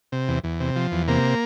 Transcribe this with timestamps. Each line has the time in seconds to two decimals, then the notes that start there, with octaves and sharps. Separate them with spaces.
0.12 C3
0.28 E2
0.44 E2
0.60 C3
0.76 F3
0.92 E2
1.08 C3 A#3